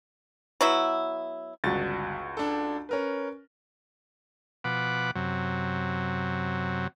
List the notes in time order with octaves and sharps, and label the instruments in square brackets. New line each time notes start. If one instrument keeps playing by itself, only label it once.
[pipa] F#3 B3 E4
[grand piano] G1 A6 [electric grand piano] C#2 F#4
[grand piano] D4 A4
C#4 A#4 B4
[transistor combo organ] B2 F3 B4 F#5 D6
F#2 C3 F#3